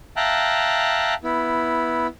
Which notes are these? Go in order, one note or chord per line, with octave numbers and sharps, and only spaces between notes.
E5 F5 G5 A5 A#5 F#6
B3 E4